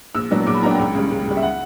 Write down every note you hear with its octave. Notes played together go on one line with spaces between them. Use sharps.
A#1 E6
A#2 F#3 B3 D4
A#1 D6
B5
A#2 F#3 B3 D4 A#5
G5
C#2
C#3 G3
C#2
C#3 G3
E5
F#5